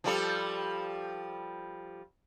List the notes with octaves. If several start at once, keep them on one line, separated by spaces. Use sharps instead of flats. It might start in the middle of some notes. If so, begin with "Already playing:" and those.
F3 G3 A4